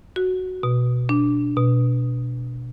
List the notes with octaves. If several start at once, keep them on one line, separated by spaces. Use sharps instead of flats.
F#4
B2
D4
B2